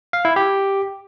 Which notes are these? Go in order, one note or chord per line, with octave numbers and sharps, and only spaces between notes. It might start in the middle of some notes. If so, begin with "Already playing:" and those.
F5
E4
G4